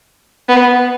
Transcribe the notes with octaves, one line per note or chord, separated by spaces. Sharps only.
B3